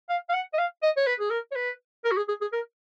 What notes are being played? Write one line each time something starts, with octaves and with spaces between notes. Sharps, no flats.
F5
F5
F#5
D#5
F5
D#5
C#5
B4
G#4
A#4
C#5
B4
A#4
F#4
G#4
G#4
G#4
A#4